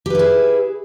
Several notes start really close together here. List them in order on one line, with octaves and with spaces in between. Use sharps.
G4 B4 E4 G#4